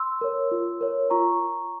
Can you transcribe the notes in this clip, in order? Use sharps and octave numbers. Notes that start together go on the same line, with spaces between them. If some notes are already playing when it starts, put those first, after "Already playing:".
Already playing: C6 E6
A#4 C#5
F4
A#4 C#5
F4 A#5 C#6